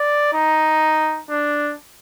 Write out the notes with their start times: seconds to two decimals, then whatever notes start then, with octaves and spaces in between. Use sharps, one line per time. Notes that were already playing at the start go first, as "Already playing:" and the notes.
Already playing: D5
0.33 D#4
1.30 D4